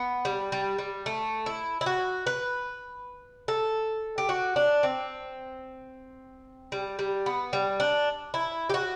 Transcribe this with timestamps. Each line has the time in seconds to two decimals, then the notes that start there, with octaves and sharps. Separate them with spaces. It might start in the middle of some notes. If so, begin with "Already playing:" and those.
Already playing: B3
0.25 G3
0.52 G3
0.79 G3
1.06 A3
1.46 E4
1.81 E4
1.86 F#4
2.27 B4
3.48 A4
4.18 G4
4.29 F#4
4.56 D4
4.83 C4
6.72 G3
6.99 G3
7.26 B3
7.53 G3
7.80 D4
8.34 E4
8.70 G4
8.74 F#4